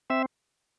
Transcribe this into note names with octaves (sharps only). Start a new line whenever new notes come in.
C4 E5